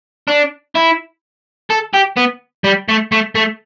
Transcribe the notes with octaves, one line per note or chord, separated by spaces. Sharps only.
D4
E4
A4
G4
B3
G3
A3
A3
A3